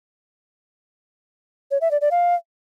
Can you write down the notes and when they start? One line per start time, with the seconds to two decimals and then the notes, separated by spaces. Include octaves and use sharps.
1.71 C#5
1.81 E5
1.91 D5
2.01 D5
2.11 F5